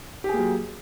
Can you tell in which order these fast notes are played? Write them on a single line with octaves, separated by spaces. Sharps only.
G4 G#4 A#3 F#3